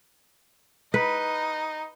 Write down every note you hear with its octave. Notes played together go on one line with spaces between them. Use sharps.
D#4 B4